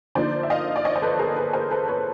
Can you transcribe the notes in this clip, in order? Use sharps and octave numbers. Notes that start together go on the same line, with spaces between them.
D3 F3 A#3 D#4 C5 D5
E5
D#5 F5
D5
C#5 D#5
C5
A4 B4
G#4 A#4
A4 B4
A#4 C5
A4 B4
B4 C#5